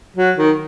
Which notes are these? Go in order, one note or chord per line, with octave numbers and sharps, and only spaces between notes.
F#3
D#3